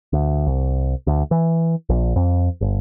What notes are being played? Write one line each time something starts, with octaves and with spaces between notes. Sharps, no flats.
D2
C2
D2
E3
A#1
F2
G1